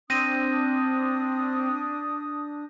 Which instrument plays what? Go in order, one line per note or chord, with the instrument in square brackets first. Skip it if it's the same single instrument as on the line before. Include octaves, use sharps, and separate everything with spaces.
[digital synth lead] C4 [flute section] D4 D#6 [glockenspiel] G6 A#6 D#7